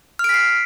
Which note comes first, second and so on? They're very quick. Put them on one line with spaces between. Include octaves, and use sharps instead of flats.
F6 D7 B6 C7